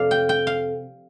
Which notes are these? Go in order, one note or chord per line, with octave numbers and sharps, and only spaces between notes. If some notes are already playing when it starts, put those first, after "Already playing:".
Already playing: F2 C3 D5 F5
G5
G5
F5